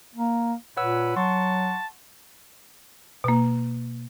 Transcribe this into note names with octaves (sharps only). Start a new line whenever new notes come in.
A#3
A#2 B4 C#5 F#5 E6
F#3 F#5 A5 C6 C#6
B2 A#3